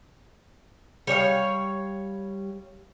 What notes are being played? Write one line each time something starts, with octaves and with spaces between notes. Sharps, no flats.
G3 C#5 D5 F5